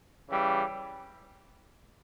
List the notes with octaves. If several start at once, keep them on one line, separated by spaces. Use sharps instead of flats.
C#3 E3 G3